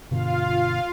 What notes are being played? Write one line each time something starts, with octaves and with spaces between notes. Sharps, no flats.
G2 B2 D3 F4 F5